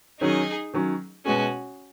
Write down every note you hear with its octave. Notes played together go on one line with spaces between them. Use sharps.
D#3 F#3 C#4 D#4 G#4
D#3 F#3 C#4
B2 G#3 B3 C#4 F#4 G#4